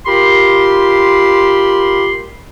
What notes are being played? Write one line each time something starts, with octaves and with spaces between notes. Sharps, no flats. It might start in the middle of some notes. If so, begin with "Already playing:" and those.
F4 G4 A#4 B5 C6